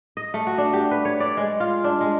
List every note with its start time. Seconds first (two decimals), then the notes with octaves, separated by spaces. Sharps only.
0.17 D#5
0.34 A3
0.47 F#4
0.58 D4
0.73 G4
0.91 B4
1.05 C#5
1.20 D5
1.37 G#3
1.60 F4
1.84 D4
2.01 G#3